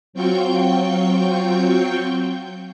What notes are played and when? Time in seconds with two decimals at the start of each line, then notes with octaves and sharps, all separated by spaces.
0.13 F#3 C4 F4 G5 C#6 G6